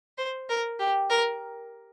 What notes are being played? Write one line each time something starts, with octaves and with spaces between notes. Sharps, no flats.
C5
A#4
G4
A#4